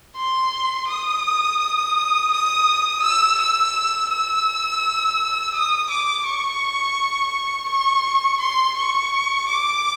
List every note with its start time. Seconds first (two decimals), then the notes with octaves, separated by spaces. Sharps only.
0.16 C6
0.87 D#6
2.31 D#6
3.03 E6
3.39 E6
4.10 E6
5.55 D#6
5.90 D6
6.26 C#6
7.69 C#6
8.41 C6
8.77 C#6
9.49 D6